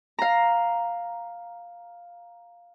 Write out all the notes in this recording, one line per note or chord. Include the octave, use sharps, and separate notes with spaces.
F5 A#5